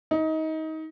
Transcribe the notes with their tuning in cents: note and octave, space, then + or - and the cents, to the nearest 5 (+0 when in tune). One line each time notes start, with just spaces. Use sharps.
D#4 +25